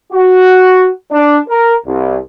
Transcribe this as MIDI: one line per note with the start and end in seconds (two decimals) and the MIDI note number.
0.12 0.88 66
1.11 1.37 62
1.48 1.73 70
1.85 2.17 36